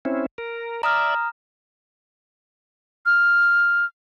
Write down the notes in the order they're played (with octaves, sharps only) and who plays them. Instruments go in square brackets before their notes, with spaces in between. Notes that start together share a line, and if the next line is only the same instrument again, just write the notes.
[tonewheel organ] C4 C#4 E4
A#4
[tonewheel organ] D5 E5 [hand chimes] A#5 D#6 F6
[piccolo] F6